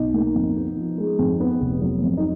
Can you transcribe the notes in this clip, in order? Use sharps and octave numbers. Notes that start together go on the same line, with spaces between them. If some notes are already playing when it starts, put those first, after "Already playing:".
Already playing: B1 D#4
A#3
F2
B3
F3
G#3
F2
B3
F1
F#3
F2
D#4